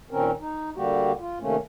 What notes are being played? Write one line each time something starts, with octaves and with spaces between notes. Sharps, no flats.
A#2 D#3 C4 C#4 A#4
D#4
D3 G3 A#3 F#4 G4
F4
C3 D#3 A3 A#3 C#4